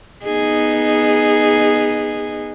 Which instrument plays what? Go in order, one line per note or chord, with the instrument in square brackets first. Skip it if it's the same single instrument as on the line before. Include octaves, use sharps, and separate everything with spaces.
[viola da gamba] B3 D#4 G#4